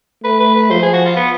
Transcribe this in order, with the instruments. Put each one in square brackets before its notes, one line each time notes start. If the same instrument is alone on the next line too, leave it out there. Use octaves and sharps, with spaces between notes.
[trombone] A3 [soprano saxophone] B4
[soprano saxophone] B4
B4
[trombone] F3 [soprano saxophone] C5
[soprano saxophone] G#4
F#4
F4
B3